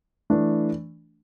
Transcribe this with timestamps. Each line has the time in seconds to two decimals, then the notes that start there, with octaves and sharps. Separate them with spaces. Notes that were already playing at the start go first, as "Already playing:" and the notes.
0.30 E3 A3 D4